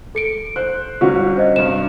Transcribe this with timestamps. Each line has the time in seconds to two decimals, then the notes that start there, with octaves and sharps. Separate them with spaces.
0.15 A4 C#7 D7
0.56 C5 F#6
1.01 G1 G3 C#4 F#4
1.37 C5 D#5
1.56 G2 C3 E7